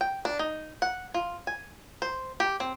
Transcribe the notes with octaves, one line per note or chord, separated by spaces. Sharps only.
G5
D4
D#4
F#5
F4
G#5
C5
G4
C4